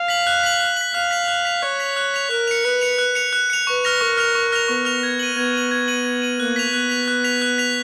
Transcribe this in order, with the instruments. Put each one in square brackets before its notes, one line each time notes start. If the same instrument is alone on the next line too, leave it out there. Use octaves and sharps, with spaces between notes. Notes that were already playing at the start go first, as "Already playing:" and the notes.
Already playing: [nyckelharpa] F5
[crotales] B6 F#7
F#6
B6 F#7
F#6
B6 F#7
[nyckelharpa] F5 [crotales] F#6
[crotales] B6 F7
F#6
B6 F7
[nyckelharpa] C#5 [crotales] F#6
[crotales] B6 F7
F#6
B6 F7
[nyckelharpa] A#4 [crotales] F#6
[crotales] C#7 F7
[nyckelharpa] B4 [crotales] F#6
[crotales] C#7 F7
F#6
C#7 F7
F#6
C#7 F7
[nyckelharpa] B4 [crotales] C#6
[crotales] F6 A#6 F7
[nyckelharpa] A#4 [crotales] C#6
[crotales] F6 A#6 F7
C#6
F6 A#6 F7
[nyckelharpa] B3 [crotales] C#6
[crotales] F6 A#6 F7
G#6
D#7 F#7
[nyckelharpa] B3 [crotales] G#6
[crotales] D#7 F#7
G#6
D#7 F#7
G#6
D#7 F#7
[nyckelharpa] A#3 [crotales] F#6
[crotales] B6 F7
[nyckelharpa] B3 [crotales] F#6
[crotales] B6 F7
F#6
B6 F7
F#6
B6 F7